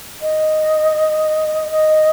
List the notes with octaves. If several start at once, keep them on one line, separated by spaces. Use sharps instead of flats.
D#5
D#5